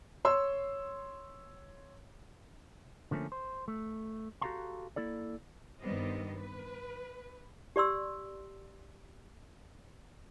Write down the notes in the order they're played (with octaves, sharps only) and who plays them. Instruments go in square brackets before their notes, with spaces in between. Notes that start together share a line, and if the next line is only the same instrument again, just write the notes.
[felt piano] C#5 C6 E6
[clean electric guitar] D3 F3 A3 A#3 C#4
C5
A3
F#4 G4 A4 F5 A#5 C6
A#3 E4 A4 D5
[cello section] G2 D#3 G3 B3 C4 D#5
B4
[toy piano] G4 D5 C6 E6